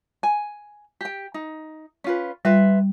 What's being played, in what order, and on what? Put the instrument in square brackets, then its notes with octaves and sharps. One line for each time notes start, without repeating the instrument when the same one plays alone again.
[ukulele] G#5
G4 G5
D#4
C#4 F4 B4
[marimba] G3 [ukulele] F4 B4 E5